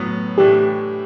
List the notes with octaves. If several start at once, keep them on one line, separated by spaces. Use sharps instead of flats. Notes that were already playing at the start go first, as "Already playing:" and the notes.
Already playing: A2 F#3 B3
A2 E3 A3 D4 G4